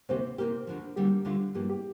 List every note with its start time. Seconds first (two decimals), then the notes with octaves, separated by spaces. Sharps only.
0.09 D2 C3 A#3 G4 C5
0.38 C3 A#3 G4 A#4
0.67 D2 D3 F3
0.96 D2 D3 G3 A#3 G4
1.25 D2 D3 G3 D4 F4
1.55 G2 F3 A#3 G4
1.69 G4